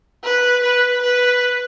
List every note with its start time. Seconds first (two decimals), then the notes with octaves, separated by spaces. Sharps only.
0.23 B4
0.63 B4
1.02 B4